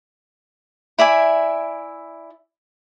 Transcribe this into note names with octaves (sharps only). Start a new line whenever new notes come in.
E4 D5 E5 G#5